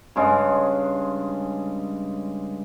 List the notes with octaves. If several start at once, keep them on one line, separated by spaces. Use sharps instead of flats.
G2 C#3 G#3